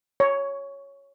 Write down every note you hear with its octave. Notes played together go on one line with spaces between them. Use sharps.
C#5